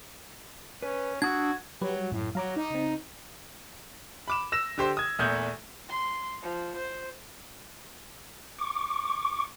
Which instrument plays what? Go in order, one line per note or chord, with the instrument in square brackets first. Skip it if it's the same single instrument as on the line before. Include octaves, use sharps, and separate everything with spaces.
[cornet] C#4 [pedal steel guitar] B4
[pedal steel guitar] D4 D#6 E6 [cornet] F#4 [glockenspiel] G#6
[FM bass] F#3 [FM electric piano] G4 B4
[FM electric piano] G3
[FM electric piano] F#2 [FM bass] A2
[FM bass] F#3 [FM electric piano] F5 A#5 D6
[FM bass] D#4
[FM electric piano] C#3 C4
[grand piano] B5 D6 E7
E6 A#6 E7
D3 G4 C5
D#6 G#6
E2 A#2 A3 D#6 G6 G#6
[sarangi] C6
F3
C5
[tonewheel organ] C#6 D6